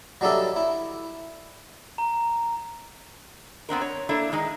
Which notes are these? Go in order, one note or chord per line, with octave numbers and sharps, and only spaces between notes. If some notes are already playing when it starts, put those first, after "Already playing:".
F#3 G3 D4 D#4 A4 E5
E4
A#5
B3 C4 D4 A#4
C#5
A3 A#3 D4 E4
D#3 G#3 D#4